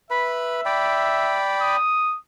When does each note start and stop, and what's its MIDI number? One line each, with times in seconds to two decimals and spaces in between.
0.11 0.61 71
0.11 1.44 76
0.11 0.61 83
0.65 1.76 74
0.65 1.76 79
0.65 1.76 83
1.61 2.17 87